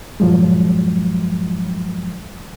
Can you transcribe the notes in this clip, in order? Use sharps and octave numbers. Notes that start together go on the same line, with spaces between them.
G2 A#2 F3 F#3 G#3